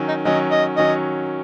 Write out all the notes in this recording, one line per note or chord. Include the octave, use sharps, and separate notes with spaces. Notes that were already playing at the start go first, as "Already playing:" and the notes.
Already playing: D#3 F#3 C#4
D#4
D#3 F#3 C#4 D#5
D#5
D#3 F#3 C#4 D#5